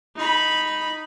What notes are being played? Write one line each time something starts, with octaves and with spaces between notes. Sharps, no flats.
D#4 B5